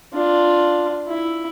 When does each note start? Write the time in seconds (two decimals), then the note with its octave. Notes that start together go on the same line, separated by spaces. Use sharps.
0.13 D4 F4
1.08 E4